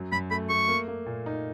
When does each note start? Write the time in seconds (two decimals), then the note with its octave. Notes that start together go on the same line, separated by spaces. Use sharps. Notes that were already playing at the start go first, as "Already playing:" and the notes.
Already playing: F#2 F#3
0.12 F#2 B5
0.31 A3 B5
0.49 A3 C#6
0.68 A#3
0.88 A#3
1.06 A#2
1.26 D#4